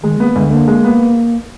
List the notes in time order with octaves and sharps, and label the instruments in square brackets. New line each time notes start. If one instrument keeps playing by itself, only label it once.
[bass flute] D#3 [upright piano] G#3
[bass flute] A#3 [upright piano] B3
[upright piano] D2 [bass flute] G#3
[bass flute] G#3
[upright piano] D3 [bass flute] A#3
[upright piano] G#3
B3